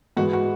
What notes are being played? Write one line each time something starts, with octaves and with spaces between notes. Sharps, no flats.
G#2 E3 G#3 B3 F#4
F#4